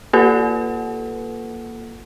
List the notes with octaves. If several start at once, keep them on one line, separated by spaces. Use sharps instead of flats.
A#3 F4 A4 B4 F#5